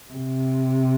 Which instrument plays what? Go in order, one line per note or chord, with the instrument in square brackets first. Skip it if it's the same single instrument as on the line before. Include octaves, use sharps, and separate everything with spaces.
[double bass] C3